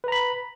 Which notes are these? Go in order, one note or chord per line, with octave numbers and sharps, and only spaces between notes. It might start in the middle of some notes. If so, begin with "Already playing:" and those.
B4 A#5 B5